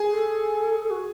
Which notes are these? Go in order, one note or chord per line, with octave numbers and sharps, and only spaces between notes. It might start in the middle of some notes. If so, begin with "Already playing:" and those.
Already playing: G#4
A4
F#4